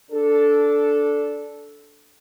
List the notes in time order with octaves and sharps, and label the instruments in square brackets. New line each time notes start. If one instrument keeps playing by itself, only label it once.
[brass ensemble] D4 A4